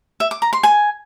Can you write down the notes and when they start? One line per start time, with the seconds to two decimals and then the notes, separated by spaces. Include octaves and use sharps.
0.20 E5
0.31 D6
0.42 A#5
0.53 C6
0.63 G#5